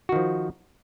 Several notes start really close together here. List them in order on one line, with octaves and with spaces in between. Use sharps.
F#4 D#3 F3